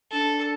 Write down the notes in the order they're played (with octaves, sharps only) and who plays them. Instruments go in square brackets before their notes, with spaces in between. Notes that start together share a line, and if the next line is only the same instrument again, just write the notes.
[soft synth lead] D4 [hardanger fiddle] A4